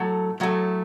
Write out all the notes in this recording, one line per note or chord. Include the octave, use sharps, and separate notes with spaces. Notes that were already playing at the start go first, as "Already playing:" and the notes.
Already playing: A2 F#3 A3
A2 F#3 A3